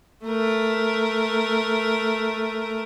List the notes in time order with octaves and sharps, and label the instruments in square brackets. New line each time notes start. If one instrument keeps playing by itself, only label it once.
[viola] A3 A#4